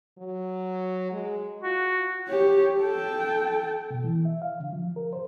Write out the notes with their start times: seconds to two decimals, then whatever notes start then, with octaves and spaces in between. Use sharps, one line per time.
0.18 F#3
1.12 G#3
1.62 F4 F#4
2.27 G4 C#5
2.80 A4 G5
3.90 B2
4.04 E3
4.25 E5
4.42 F5
4.60 D3
4.72 F3
4.96 A#4
5.13 C5